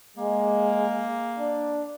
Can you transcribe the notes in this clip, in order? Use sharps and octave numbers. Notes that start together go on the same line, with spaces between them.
G#3 A#3
D4